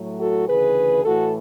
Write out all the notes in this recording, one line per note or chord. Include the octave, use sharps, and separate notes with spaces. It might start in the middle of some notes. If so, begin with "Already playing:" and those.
Already playing: A2 F#3 A3
F#4 A4
D2 C#3 E3 G#4 B4
A2 E3 A3 F#4 A4